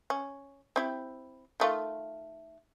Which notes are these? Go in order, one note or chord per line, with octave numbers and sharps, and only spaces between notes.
C#4
C4 E4 G4
D#3 A3 F4